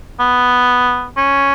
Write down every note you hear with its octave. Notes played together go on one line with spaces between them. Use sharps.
B3
C#4